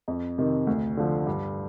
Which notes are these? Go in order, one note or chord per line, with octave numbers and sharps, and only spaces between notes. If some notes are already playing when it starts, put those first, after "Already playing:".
F2
C3 D#3
D2
D3 F3
G2